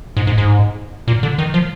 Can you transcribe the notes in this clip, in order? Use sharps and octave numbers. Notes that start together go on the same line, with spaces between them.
G#2
G#2
G#2
A#2
D3
D#3
F3